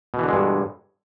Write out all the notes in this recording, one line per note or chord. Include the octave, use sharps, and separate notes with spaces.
G2 B2 D3 E3 G#3